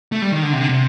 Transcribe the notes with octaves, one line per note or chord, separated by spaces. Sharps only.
A3
G3
D#3
D3
C3
D3
C3